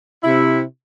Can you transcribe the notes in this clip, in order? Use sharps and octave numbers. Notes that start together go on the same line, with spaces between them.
C3 E4